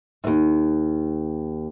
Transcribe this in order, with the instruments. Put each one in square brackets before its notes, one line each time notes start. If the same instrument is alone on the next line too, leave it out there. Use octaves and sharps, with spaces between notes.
[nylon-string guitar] D#2 G#2